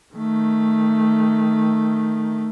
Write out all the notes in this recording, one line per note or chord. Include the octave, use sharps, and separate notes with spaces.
D#3 A3